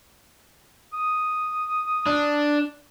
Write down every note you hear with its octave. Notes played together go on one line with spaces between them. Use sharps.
D#6
D4